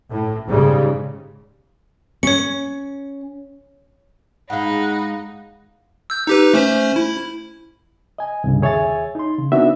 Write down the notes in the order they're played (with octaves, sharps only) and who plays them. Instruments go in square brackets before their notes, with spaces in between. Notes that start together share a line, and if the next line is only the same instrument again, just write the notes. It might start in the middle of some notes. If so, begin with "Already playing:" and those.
[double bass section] A2
G#2 C#3 G3
[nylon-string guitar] C#4 [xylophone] C#5 C#7
[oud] G#2 G#3 [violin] D#4 [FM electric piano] F5 F#5 [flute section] B5 F#6
[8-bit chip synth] E6 G6
D#4 G4 B4
A3 C#4 C5
E4
[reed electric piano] D#5 G#5
C2 G2 C#3
D#2 G#4 C#5 E5 G#5 A6
D#4 C6
C#3
B3 C4 D4 D#4 F#4 E5